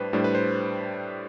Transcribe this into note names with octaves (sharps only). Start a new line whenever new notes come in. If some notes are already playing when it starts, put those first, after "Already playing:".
Already playing: A2 G3 D4 B4 C5
A2 G3 D4 C5
B4
C5